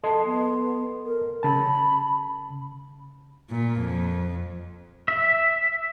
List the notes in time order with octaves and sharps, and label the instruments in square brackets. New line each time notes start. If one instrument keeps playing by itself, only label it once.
[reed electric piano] A4 D#5 C6 [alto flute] A5
[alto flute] B3
A#4
[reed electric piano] C#3 A5 [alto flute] B5
[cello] A#2
F2
[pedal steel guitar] E5